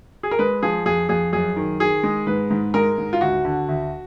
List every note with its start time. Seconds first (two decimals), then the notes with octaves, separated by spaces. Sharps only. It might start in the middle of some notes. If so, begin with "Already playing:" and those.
0.23 G#4
0.31 A#4
0.39 G#3 B4
0.63 F3 G#4
0.86 F2 G#4
1.09 F2 G#4
1.33 F#2 G#4
1.56 D#3
1.80 D#3 G#4
2.03 G#3
2.27 G#2 B4
2.51 G#2
2.74 G#3 A#4
2.98 G#2
3.13 F4
3.21 D2 F#4
3.45 D3
3.68 D2